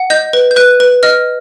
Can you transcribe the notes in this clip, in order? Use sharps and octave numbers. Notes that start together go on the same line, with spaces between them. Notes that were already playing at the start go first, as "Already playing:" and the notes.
Already playing: F#5
D#5 G6
B4
G6
B4 F#6
B4
D#5 F6